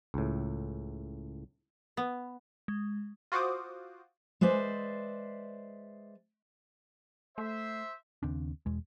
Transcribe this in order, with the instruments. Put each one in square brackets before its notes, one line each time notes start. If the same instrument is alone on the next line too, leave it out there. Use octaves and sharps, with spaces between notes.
[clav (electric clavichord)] C#2 A2
[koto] B3
[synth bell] G#3
[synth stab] F4 F#4 C5 F#5 D6 D#6
[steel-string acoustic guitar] G#3 B4 C5 D5 E5
[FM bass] A3 [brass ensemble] C5 E5
[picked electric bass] D#2 C#3 C4 D4
E1 E2 G#3